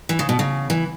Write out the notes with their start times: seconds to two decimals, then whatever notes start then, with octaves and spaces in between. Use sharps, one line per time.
0.09 E3
0.19 C#3
0.29 B2
0.39 C#3
0.70 E3